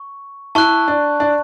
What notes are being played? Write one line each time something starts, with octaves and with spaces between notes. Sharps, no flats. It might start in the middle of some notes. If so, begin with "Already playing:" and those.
Already playing: C#6
E4 A5 C#6 F#6
D4
D4